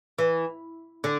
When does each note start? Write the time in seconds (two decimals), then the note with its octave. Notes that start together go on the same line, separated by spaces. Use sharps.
0.18 E3
1.04 D3